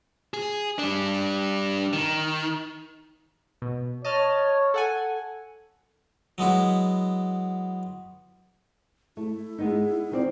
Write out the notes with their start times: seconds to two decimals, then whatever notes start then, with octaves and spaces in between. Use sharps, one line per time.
0.34 G#4
0.79 G3 D4
1.93 D#3
3.62 B2
4.05 C#5 D#5 A5 F6
4.74 A4 F#5 G#5
6.38 F#3 G#3 B3 E4
9.17 A3 E4
9.58 G#3 B3 D#4
10.11 D#3 C4 D5